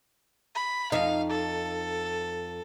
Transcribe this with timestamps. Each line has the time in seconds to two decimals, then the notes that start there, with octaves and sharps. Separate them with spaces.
0.55 B5
0.92 F2 D#4 F5
1.30 A4